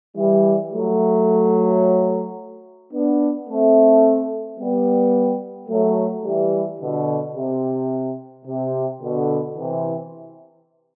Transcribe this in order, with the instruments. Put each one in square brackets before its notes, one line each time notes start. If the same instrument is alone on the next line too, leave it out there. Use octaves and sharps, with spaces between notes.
[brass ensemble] E3 G3
F#3 A3
B3 D4
A3 C4
G3 B3
F#3 A3
E3 G3
B2 D3
C3
C3
B2 D3
C3 E3